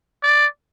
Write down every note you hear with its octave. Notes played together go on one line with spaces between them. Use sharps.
D5